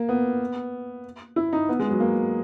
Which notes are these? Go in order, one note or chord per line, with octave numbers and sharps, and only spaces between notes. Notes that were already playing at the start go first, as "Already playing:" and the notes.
Already playing: A#3
B3
E4
D#4
B3
G#3
F#3
A#3